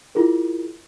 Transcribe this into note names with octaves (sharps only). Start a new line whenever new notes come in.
E4 F4 G#4 A#4